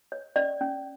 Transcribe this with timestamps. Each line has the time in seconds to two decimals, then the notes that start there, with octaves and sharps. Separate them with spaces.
0.12 C#5
0.36 C#4 D5
0.61 C#4